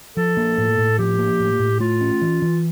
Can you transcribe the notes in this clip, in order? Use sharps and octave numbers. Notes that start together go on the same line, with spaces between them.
F3 A4
A#3
A2
A2
F3 G4
A#3
A2
A2
A3 F4
C#4
E3
E3